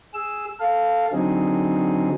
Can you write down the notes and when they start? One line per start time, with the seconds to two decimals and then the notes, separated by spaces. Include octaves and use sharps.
0.14 G#4 E6
0.60 A4 F5
1.13 D3 F#3 C4 D#4 G#4